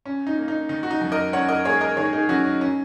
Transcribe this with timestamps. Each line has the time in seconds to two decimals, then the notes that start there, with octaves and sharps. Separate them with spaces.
0.06 C#4
0.27 D#4
0.38 A#3
0.48 D#4
0.69 D#3 D#4
0.83 F#4
0.91 D#4
1.01 F#2
1.12 A#4 D#5
1.33 C#4 C#5 F#5
1.49 A#4 D#5
1.65 A#3 G#4 C#5
1.81 A#4 D#5
1.97 D#3 G#4 C#5
2.13 D#4 G#4
2.29 F#2 C#4 F#4
2.45 C#4
2.61 C#4